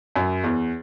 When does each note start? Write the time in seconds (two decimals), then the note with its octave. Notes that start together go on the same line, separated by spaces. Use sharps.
0.16 F#2
0.44 E2